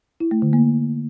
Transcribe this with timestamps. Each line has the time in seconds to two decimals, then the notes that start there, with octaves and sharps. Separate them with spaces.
0.20 E4
0.31 A3
0.42 D3
0.53 A#3